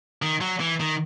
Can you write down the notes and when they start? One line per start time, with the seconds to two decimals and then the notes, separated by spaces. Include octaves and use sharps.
0.22 D#3
0.41 F#3
0.60 E3
0.80 D#3